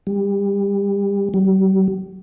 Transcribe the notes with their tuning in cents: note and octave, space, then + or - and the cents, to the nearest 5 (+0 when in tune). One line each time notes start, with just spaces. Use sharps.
G3 +30
G3 -45